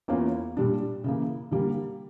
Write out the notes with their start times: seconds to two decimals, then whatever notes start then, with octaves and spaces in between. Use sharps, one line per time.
0.08 E2 E3 A#3 C#4 F4
0.57 A#2 G3 D4
1.04 C#3 E3 A#3
1.51 D3 G3 A#3